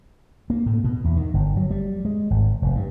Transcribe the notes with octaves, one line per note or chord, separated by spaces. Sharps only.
A#3
A2
B2
E2
D#3
G1
F#3
G3
G#3
G#1
F1
G2